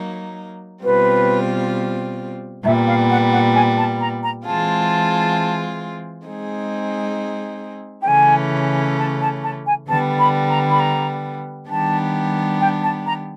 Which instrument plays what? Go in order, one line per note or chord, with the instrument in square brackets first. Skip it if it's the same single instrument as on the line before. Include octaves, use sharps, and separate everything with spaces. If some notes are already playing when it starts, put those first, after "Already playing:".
Already playing: [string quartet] F#3 A#3 D#4
[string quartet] B2 G3 C4 F4 [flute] B4
[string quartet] A#2 G3 B3 [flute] E5
[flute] F5
F#5
F#5
G#5
A5
A#5
A#5
[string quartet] E3 G#3 C4 F4 G#4 [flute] A5
[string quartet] G#3 C4 D#4 G#4
[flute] G5
[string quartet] C#3 E3 A3 C#4 [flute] G#5
[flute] A5
A5
A5
G#5
[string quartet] D3 G3 B3 [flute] A5
[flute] B5
A#5
B5
A#5
[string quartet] D#3 G3 B3 D4 G4 [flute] A5
[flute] G5
A5
A#5